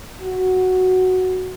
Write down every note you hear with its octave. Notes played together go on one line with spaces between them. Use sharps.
F#4